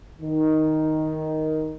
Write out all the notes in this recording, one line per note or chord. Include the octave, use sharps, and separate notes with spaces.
D#3